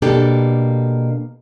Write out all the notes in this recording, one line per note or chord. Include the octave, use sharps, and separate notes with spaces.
B2 A#3 D4 G4 A4